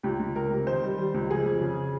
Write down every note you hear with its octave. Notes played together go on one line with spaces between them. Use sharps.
C#2 G4
C#2
C#2 A#4
C3
D#3 C5
G3
G3
C#2
F3 G#4
F2
C#3